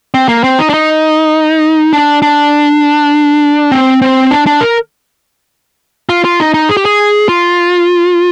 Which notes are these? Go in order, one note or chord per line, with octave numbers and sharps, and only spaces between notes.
C4
A#3
C4
D#4
D4
D#4
D4
D4
C4
C4
D4
D4
A#4
F4
F4
D#4
D#4
G#4
G4
G#4
F4